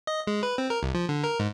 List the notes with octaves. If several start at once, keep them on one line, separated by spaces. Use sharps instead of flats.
D#5
G#3
B4
C4
A#4
C2
F3
D3
A#4
G#2